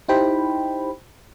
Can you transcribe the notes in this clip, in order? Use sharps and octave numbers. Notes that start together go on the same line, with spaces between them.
D#4 E4 G4 C5 G5 B5